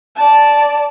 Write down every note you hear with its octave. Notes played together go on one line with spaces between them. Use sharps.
D5 A5